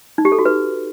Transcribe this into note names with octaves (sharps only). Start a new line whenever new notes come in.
D#4
G4
A4
F#4
B4